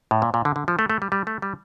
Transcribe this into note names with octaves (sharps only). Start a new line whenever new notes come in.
A2
A#2
A#2
D3
D3
F3
A3
A3
G3
G3
A3
G3